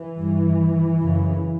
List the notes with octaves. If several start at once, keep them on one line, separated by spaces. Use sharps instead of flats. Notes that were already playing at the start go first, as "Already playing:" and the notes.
Already playing: E3
G2
F#2 C#3